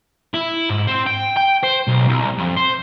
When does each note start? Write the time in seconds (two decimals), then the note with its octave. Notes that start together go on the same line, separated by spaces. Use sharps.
0.34 E4
0.70 G#2
0.87 C4
1.06 G5
1.36 G5
1.63 C5
1.87 B1
2.08 C2
2.39 F2
2.57 C5